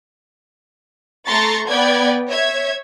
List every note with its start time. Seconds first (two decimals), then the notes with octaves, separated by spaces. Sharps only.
1.28 A3 A#5 C6 C#6 A6
1.69 B3 B4 D5 G5 G#6
2.29 C#5 E5 G#6